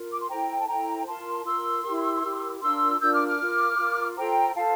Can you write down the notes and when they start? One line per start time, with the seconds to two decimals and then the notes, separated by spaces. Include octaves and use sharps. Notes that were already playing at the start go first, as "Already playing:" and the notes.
Already playing: F4 A#4
0.11 D6
0.20 C6
0.29 E4 A4 C5 G5 A#5
0.60 A5
0.67 E4 A4 C5 G5 A#5
1.06 F4 A#4 A5 C6
1.45 F4 A#4 C6 E6
1.84 E4 G4 A#4
2.23 E4 G4 A#4
2.61 D4 F4 A#4 C6 E6
3.00 D4 F4 A#4 E6 G6
3.13 D6 F6
3.26 D6 F6
3.39 F4 A#4
3.78 F4 A#4
4.17 F4 A4 C5 G5 A#5
4.56 F4 A4 C5 F5 A5